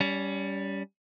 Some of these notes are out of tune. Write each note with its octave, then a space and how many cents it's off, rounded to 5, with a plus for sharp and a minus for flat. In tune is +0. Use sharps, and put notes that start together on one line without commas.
G3 +0 C#4 +30